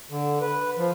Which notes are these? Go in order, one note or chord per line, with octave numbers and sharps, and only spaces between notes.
D3
B4
F3